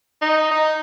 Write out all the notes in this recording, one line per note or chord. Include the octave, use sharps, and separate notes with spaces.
D#4
D#4